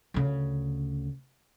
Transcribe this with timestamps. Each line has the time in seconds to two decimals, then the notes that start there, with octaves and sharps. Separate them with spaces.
0.14 D2 C#3